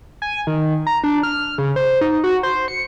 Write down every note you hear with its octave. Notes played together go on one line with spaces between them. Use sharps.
G#5
D#3
A#5
D4
F6
C#3
C5
D#4
F#4
C5
C#7